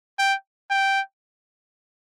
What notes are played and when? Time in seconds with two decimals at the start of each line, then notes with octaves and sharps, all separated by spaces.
0.19 G5
0.70 G5